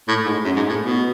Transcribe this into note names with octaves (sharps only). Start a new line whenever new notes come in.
A2
G#2
F#2
G#2
A2
B2